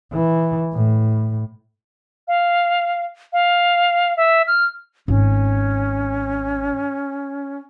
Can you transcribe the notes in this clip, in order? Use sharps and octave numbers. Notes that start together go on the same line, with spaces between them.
E3
A2
F5
F5
E5
F6
G#1 C#4